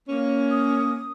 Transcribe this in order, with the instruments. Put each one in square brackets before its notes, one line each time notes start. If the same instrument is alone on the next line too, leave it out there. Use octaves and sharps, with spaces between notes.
[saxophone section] A#3 C#4
[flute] D#6